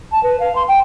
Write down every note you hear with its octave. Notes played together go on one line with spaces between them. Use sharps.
A5
B4
F5
C6
G5